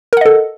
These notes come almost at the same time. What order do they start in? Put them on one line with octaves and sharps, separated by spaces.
A#4 F#5 D#5 A4